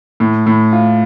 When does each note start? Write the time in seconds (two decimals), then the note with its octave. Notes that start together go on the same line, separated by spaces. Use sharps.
0.20 A2
0.47 A2
0.72 F4